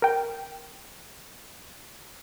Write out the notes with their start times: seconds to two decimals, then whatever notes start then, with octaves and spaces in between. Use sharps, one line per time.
0.02 A#4 G5